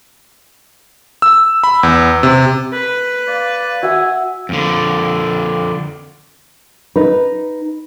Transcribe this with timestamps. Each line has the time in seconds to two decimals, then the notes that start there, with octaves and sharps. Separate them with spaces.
1.22 E6
1.64 B5
1.83 E2
2.23 C3
2.73 B4
3.28 D5 F5
3.83 F#4 E5 F#5 G#5 E6
4.49 F2 D3
6.96 D#4 B4